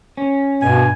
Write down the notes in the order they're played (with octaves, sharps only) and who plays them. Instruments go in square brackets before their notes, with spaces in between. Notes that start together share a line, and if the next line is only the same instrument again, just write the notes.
[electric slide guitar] C#4
[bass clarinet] G2 [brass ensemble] B2 [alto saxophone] G#5